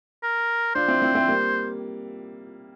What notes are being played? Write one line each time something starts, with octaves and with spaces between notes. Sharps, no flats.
A#4
D4 F4 C5
C4 E4
C4 E4
C4 E4
G3 A#3